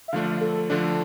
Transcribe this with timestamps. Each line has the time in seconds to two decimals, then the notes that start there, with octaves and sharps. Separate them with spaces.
0.08 E5
0.12 D3 F3 A3 D4 F5
0.41 A4
0.70 D3 F3 A3 D4